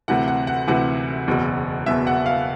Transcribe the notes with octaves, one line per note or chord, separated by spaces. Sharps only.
D2 C3 E3 F#5
F#5
F#5
D2 C3 E3 F#5
F#1 E2 B2
F#1 E2 B2 E5
F#5
F5